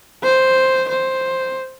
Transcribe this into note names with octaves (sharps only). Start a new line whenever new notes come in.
C5
C5